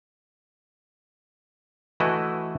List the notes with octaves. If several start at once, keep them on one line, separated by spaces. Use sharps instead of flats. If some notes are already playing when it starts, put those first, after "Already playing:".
E3 A3 E4 F#4 D#5